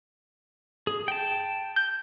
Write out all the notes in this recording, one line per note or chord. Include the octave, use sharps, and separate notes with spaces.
G#4
G5 A5
G6